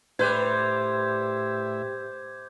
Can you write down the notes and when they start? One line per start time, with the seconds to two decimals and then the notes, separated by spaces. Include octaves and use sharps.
0.19 A2 G3 B4 C5 E5 D6 G6 G#6